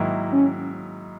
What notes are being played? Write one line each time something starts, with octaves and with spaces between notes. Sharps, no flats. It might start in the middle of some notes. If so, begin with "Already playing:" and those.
Already playing: G#2 D#3 F#3 A#3 E4
C#4